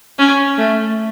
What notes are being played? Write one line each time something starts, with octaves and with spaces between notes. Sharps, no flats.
C#4
A3